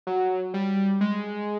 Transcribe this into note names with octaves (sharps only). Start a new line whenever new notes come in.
F#3
G3
G#3